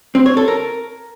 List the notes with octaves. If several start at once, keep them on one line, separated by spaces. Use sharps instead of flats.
C4
C#5
A4
A#4